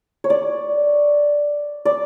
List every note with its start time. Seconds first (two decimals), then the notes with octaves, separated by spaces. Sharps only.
0.24 C#5
0.30 D5
1.85 D5